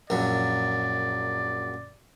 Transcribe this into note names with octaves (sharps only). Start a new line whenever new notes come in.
A#1 F#2 F#3 D5